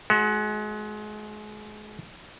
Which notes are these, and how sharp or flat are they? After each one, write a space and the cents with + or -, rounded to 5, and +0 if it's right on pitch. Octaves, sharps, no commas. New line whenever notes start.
G#3 +30 F#4 +0